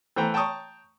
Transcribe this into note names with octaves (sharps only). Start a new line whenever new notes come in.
E3 A3 C5 G5 A#5
G5 A5 A#5 C#6 D#6